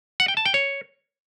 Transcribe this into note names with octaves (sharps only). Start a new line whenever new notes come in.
F#5
G5
A5
G5
C#5